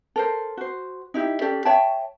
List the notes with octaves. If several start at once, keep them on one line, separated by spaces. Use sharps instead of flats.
A4 A#4 C5
F#4 C5
D#4 E4 G4
C#4 G4 A4 D5
C#5 E5 G5 A5